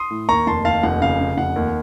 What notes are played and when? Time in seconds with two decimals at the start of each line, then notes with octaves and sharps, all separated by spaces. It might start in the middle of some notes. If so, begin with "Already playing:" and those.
Already playing: C6 D#6
0.10 A2
0.29 D#2 A#5 C#6
0.47 F1 A5 C6
0.64 D#2 F5 A5
0.83 F1 F#5
1.01 C#3 F5
1.20 C#3
1.37 F1 F#5
1.56 D#2